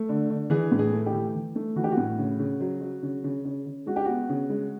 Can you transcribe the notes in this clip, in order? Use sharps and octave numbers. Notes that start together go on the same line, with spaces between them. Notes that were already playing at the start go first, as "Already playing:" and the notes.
Already playing: A3
D3
D3
E3 G#4
A2
G#4
A3
G4
E3
E3
A3
E3 F#4
G4
F#4
A2
C#3
C#3
F#3
F#3
C#3
C#3
C#3
C#3
G#3 F#4
G4
B3 F#4
C#3
G#3